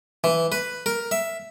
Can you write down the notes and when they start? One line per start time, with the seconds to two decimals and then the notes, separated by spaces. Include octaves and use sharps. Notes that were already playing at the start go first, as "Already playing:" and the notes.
0.24 E3
0.52 B4
0.86 A#4
1.11 E5